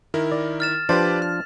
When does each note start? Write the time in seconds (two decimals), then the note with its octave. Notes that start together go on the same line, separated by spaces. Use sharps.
0.14 D#3 E4 A#4
0.32 D5
0.60 F6 A6 E7
0.89 F3 D4 G4 B4 C5 D5 A6
1.22 F6